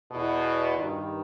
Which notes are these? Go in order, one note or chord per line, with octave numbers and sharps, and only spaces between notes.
E2 B2
G2 D#3